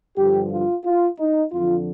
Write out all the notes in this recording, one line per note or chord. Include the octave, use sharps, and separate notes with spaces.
G2 D3 F3 G4
F4
F4
D#4
F2 D3 F3 F4